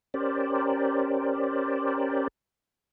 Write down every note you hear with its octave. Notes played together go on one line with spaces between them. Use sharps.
C#4 G4 A#4 C5 D5